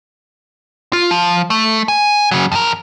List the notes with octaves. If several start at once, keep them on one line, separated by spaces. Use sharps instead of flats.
F4
F3
A3
G#5
C#3 F#3
F2 A#4